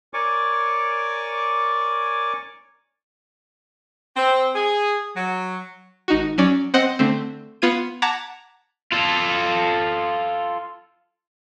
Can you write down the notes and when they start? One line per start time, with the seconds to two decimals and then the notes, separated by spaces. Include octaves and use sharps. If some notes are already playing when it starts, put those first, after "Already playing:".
0.14 A#4 C#5 D5 G#5 C#6 D6
4.17 C4
4.55 G#4
5.15 F#3
6.08 G#1 D#4 F#4
6.38 F#3 C#4 D5
6.74 C4 C5 D#5 F#5
6.99 D3 A3 C4
7.62 B3 F4 G#6 D#7
8.02 F#5 A5 A#5 D6 G#6 B6
8.92 F4 A4